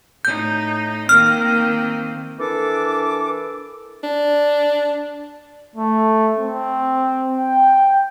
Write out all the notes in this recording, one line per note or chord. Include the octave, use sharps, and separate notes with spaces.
A2 D#4 G6
D#3 A#3 C4 F6
E3 D4 A4 A#4 D6
D4
A3
C4
G5